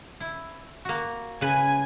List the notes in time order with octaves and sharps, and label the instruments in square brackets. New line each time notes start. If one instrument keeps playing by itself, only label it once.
[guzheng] E4
A#3 F#4
[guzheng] C#3 B4 [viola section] G#5